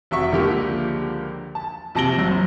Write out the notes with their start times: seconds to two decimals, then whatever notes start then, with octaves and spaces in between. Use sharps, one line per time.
0.11 F1 F#4 E5 C#6
0.32 C#2 D3 F3 A#3 G4 A#4
1.55 A5
1.95 A#1 C3 A5 A#6 D7 G7
2.18 F#1 F#2